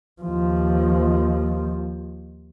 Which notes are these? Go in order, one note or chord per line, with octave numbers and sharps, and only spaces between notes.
D#2 F3